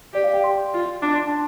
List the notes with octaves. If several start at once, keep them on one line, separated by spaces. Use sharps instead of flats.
G4 D5
F5
G5
C6
F4
D4 D6
C6
A5